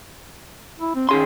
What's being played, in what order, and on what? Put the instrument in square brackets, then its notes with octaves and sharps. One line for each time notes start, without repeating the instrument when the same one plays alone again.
[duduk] E4
C4
[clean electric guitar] D#3 G#4 C6 [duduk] C#4